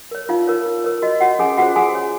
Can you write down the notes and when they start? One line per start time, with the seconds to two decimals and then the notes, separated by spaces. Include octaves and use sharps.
0.11 A#4 C#5
0.29 D#4 F4 F5
0.47 A#4 C#5
0.66 D#4
0.84 A#4 C#5
1.02 F#4 D#5
1.20 F#4 C#5 F#5
1.39 C#4 G#4 G#5
1.58 F4 F#4 G#4 C5 F#5
1.76 F#4 G#4 G#5
1.95 C#5